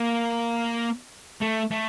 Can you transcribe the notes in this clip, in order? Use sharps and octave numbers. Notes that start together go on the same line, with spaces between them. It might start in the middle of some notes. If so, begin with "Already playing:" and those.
Already playing: A#3
A3
A3